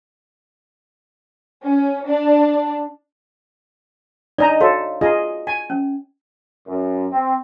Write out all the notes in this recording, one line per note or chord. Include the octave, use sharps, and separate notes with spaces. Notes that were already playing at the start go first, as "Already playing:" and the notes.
C#4
D4
D4 D#4 D5 D#5 A#5
F#4 A4 C#5 F5
F4 G#4 D#5
G#5
C#4
F#2
C4